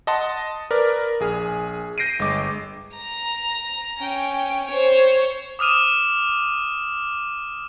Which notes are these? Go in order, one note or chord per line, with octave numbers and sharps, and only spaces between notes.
D#5 F#5 A5 C6 D#6
A#4 B4 D5
A#1 G#4 F6
G6 A#6 C7 D7 D#7
G1 G#3 D#5 D6
A#5
C#4 G5
C5 C#5
D6 D#6 F6 D#7 E7